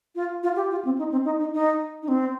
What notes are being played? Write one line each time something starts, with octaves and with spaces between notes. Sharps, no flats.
F4
F4
G4
F4
C4
D#4
C4
D#4
D#4
D#4
D#4
C4